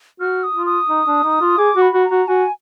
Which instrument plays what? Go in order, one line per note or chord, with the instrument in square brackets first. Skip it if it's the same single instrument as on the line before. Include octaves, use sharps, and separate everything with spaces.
[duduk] F#4 [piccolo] F6
[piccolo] D#6
[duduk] F4
[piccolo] D#6
[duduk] D#4
D4
D#4
F4
[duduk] G#4 [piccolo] D6
[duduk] F#4
[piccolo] B5
[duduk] F#4
[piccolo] A#5
[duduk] F#4
[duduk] F#4 [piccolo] G#5